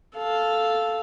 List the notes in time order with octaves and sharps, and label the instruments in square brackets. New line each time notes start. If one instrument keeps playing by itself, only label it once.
[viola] A4 F5